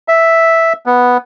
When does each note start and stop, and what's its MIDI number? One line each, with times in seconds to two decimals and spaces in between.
0.08 0.73 76
0.86 1.17 59